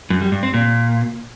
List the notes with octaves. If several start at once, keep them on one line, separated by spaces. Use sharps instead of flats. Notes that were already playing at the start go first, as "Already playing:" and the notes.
F#2
G3
G2
C4
A#2